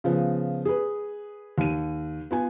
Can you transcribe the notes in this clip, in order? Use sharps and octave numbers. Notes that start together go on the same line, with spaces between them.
C#3 F3 B3
G#4 B4
D#2 D#7
B3 F4 G#5